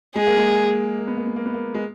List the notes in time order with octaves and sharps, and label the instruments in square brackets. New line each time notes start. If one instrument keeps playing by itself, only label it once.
[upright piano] G#3 [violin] G#4
[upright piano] A#3
G#3
A#3
B3
A#3
B3
A#3
B3
A#3
G#3